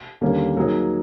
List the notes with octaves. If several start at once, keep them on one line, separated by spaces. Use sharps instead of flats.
D#2 D3 G3 A#3 C#4
F#3 A#3 D#4 G#4